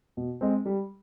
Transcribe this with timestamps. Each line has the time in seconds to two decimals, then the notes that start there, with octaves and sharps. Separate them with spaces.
0.17 B2
0.41 G#3 C4
0.66 G3